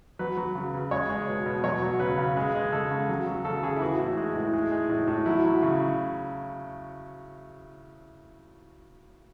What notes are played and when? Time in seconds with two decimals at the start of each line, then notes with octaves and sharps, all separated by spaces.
0.19 F#3 B4
0.37 F#3
0.55 C#3
0.74 C#3
0.91 G#3 C#5
1.09 G#3
1.28 B2
1.46 B2
1.64 F#3 C#5
1.82 F#3
2.00 C#3 B4
2.18 C#3
2.37 G#3
2.55 G#3
2.72 C#3 A4
2.91 C#3
3.09 F#3
3.27 F#3
3.45 C#3 A4
3.63 C#3 G#4
3.76 E4
3.81 E3 F#4
3.99 A2
4.17 G#3
4.35 A2
4.53 G#3
4.71 G#3
4.90 A2
5.08 A2
5.26 F#3 E4
5.45 F#3
5.63 C#3